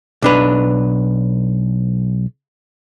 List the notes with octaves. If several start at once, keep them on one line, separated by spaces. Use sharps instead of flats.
B1 D4 B4